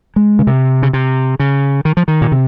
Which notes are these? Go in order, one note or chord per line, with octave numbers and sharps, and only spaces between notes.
G#3
C#3
C3
C#3
C3
C#3
D#3
F3
D#3
A#2
C3